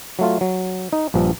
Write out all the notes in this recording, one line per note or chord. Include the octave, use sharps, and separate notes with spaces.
F#3 A3 F4
F#3
D#4
A#1 G2 F3